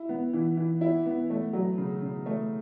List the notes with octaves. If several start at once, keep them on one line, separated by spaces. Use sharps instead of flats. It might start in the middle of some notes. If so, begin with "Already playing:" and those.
Already playing: E4
B3
E3
E3
E4
B3
A3
F#3
C#3
C#3
A3